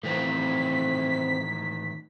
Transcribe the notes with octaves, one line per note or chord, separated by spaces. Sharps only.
A2 D#3 E3 A3 C4 B6